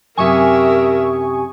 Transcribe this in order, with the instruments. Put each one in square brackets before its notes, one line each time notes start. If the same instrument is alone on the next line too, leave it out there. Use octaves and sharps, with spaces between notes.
[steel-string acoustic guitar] F#2 C3 G4 [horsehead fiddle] A#4 E5 [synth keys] G#5 C#6 D#6